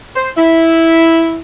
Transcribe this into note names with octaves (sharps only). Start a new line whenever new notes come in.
C5
E4